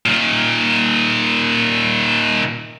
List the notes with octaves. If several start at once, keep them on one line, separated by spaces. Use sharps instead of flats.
A#2 D#3